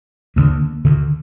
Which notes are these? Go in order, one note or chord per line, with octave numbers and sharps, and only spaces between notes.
D2 D3 A#3
D2 D3